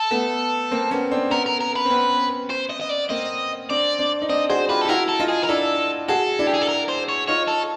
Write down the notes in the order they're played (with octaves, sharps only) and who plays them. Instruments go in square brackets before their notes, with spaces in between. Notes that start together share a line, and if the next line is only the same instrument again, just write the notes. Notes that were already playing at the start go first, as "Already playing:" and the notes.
Already playing: [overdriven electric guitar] A4
[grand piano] A3 B3
A#3 C4
B3 C#4
C4 D4
[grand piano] B3 C#4 [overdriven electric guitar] A#4
[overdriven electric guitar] A#4
A#4
B4
[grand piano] C4
B3 C#4
[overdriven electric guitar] C5
D#5
D#5
D5
[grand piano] A#3 C4 [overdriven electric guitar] D#5
[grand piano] C4 D4 [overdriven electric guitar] D5
[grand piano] C4 D4
D#4
[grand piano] C4 D4 [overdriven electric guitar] D#5
[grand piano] F#4 G#4 [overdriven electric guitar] C5
[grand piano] F4 G4 [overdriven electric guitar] B4
[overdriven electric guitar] A4
[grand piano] G4
[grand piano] E4 F#4 [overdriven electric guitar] A#4
[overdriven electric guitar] A4
[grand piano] D#4 F4
[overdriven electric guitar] G#4
A#4
[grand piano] D4 E4 [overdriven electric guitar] A4
[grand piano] F#4 G#4 [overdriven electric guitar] A4
[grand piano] D4 E4
[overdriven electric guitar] G4
G#4
A4
A#4
C5
C#5
[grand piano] D#4 F4 [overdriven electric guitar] C#5
[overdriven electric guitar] A4